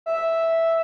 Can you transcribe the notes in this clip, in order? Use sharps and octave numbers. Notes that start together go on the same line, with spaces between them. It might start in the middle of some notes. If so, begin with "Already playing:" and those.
E5